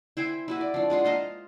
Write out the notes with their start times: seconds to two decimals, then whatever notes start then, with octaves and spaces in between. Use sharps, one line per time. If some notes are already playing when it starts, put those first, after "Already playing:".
0.17 E4 C5 G5 G#5
0.48 E4 F#4 B4
0.61 D5
0.74 F3 D4
0.90 G#3 D4 F4 F#5
1.05 C5 D#5 F5 A#5